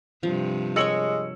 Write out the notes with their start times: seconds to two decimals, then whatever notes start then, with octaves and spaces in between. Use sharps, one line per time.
0.23 G2 C3 F3
0.76 G#3 A#4 C#5 G#5 E6 C#7 F#7